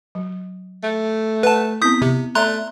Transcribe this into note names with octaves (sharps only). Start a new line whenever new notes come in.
F#3
A3
B4 E5 F#5 A5
B3 C4 E4 D#6 G6 B6
C3
A3 D5 E5 A#5 C6 F#6